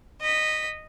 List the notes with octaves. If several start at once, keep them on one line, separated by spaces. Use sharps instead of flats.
D#5 B6